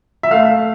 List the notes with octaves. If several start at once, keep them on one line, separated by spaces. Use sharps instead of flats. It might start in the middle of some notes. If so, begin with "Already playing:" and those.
E5
A3 F5